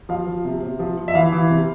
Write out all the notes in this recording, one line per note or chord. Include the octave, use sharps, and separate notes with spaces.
F3 F5
F3
C3
C3
F3
F3
E5
E3 F5
E3
C3